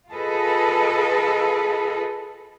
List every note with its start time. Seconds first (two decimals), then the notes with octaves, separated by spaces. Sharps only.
0.11 F4 G#4 A4 B4 D#5